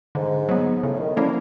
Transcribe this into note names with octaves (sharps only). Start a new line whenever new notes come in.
G#2 D3
F#3 B3
A2 C#3
D#3
D3 F3 A#3 C#4 E4